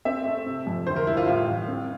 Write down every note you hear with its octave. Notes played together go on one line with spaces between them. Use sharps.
C4 E5
A3
C3
F2
D3 C5
A#4
G3 E4
F4
A2 F4
A1
C4